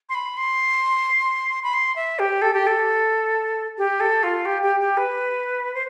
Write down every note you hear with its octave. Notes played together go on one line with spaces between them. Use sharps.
C6
B5
C6
B5
C6
E5
G4
A4
G4
A4
G4
A4
F4
G4
G4
G4
B4
C5